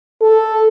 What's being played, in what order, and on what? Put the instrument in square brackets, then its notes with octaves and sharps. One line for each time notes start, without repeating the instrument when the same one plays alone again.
[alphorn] A4